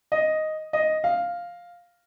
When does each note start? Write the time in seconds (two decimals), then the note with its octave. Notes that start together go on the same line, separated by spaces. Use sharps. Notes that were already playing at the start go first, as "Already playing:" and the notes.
0.12 D#5
0.73 D#5
1.04 F5